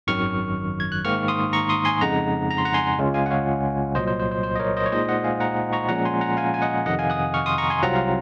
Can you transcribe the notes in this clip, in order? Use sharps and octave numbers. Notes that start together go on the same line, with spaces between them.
G#1 F#2 D#3 F#3 C#6 F6
G#6
F#6
G#2 D#3 A#3 C#6 F6
C6 D#6
A#5 C#6
C6 D#6
G#5 C6
F2 C#3 G#3 D#4 F#5 A#5
A#5
C6
F#5 A#5
G#5 C6
C#2 C#3 G#3 C#4 F4
F5 G#5
F#5
C#5 F5
C2 A#2 F#3 C5 D#5
C5
C5
C5
C5
D#5
A#4 C#5
C5 D#5
C#5
A#2 G#3 D#4 C5 D#5
D#5 F#5
F5 G#5
F#5 A#5
A#5 C#6
A#2 F3 G#3 C#4 F#5 A#5
G#5 C6
F#5 A#5
F5 G#5
G#5
D#5 F#5
F2 C3 D#3 D#5 F#5
F5 G#5
D#6 F#6
C#6 F6
C6 D#6
A#5 C#6
G#5 C6
C2 C3 F#3 C4 F4 F#5 A#5
F5